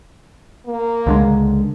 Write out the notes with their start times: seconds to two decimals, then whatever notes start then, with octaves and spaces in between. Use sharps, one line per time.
0.67 A#3
1.07 C#2 D3 G#3